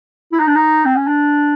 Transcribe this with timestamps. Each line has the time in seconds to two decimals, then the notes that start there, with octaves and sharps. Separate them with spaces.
0.33 E4
0.40 D#4
0.47 D4
0.56 D#4
0.85 C4
0.96 C#4
1.08 D4